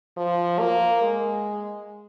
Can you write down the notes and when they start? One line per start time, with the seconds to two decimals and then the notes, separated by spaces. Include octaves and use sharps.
0.17 F3
0.59 A#3
1.02 G#3